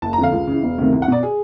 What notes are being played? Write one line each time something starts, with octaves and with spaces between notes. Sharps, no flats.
F#1 A5
A#5
F2 D3 F5
C#2
C#3 E3
E1
D2 C3 D#3
C2
F#5
B2 D5
G#4